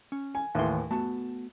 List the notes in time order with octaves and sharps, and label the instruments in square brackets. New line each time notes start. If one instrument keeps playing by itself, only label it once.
[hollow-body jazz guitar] C#4
[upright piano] G#5
[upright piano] D#2 A2 E3 [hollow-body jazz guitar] D#3 C6
[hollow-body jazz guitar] A3 B3 F#4 [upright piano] A5